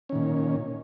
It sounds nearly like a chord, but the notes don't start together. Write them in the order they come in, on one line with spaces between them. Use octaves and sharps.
C#4 D#3 A#2